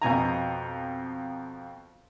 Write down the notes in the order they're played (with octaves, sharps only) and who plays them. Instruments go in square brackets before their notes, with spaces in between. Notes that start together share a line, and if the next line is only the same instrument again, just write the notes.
[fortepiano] F2 B2 G#5 A#5